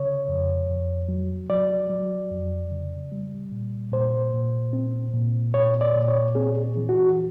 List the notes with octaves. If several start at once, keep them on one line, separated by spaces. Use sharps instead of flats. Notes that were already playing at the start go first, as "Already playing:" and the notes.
Already playing: C#3 C#5
F2
F2
F#3
F#3 D5
F#3
F2
C#3
G3
A#2
A#2 C5
A#2
C4
A#2
A#2 C#5
D5
A#2
C#5
C4 G#4
E3
F#4